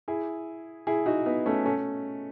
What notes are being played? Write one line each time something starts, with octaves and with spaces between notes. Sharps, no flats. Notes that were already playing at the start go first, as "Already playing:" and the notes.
E4 G#4
E4 G#4
D#4 F#4
B3 D#4
A3 C#4
A3 C#4